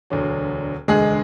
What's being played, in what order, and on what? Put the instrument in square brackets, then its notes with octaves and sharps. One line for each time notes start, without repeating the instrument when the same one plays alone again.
[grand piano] E1 D2 D3 F#3
[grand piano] E1 D2 D3 [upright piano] G#3 G#4